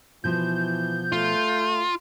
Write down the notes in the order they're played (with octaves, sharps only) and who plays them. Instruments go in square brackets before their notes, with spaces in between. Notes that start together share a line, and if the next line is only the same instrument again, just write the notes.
[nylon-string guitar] B2 F3 [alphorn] E3 [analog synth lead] G6
[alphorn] A3 [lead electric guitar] F4